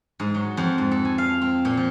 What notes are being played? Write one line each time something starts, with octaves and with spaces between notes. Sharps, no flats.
G#2
F#3
F2
G#2
A4
G#5
F5
C4
A#2
F3